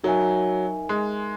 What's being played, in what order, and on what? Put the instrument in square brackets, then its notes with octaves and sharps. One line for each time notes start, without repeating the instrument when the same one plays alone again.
[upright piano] F#3 [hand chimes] D#4 A#4 E5 G#5
[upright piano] G#3